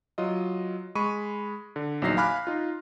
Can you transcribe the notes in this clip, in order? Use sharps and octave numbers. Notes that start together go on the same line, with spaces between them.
F#3 F4 D#5
G#3 B5 C#6 D#7
D3
A#1 E2 F#3 D#4 A#6 C7
F5 G#5 B5 D6 F6 F#6
D#4 F4